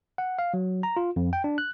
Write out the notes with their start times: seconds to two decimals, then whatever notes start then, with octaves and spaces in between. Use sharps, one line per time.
0.18 F#5
0.39 F5
0.54 F#3
0.83 A#5
0.97 F4
1.16 F2
1.33 G5
1.44 D4
1.58 F#6